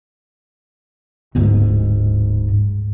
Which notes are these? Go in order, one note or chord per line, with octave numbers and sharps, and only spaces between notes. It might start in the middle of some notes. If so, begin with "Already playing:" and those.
D1 G#2